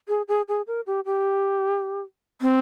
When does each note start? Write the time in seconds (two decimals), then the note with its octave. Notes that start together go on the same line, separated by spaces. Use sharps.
0.08 G#4
0.28 G#4
0.48 G#4
0.67 A#4
0.87 G4
1.05 G4
2.41 C4